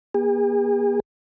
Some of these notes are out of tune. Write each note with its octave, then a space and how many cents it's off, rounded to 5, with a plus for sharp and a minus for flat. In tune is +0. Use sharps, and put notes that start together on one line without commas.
A#3 +45 G#4 -40